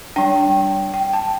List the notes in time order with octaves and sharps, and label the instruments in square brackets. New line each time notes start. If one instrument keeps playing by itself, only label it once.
[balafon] G3 D4 G5
G5
G5
A5